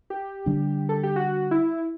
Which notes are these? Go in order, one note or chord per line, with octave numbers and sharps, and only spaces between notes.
G4
D3 G3 D4
A4
G4
F#4
E4